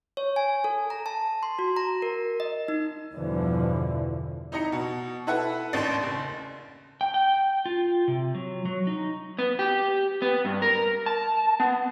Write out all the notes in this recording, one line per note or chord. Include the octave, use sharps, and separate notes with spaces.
C#5
G#5
A4
A#5
A5
C6
F#4
A#5
A#4
D#5
D#4
E2 G2 B2 D3 E3 F3
D#4 E4 D#5 A#5 C#7
B2
E4 A4 B4 E5 F#5
A1 D#2 D4 C6
F#1
G5
G5
F4
C3
F#3
F#3
D#4
B3
G4
B3
G2
A#4
A5
B3